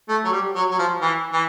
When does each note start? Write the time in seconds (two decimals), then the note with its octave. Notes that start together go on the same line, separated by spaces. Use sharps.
0.09 A3
0.24 F#3
0.32 G3
0.55 F#3
0.71 F#3
0.78 F3
1.01 E3
1.33 E3